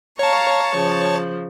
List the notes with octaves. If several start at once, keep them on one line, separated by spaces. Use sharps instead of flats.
C#5 F5 A5 A#5 C#6
C#3 F3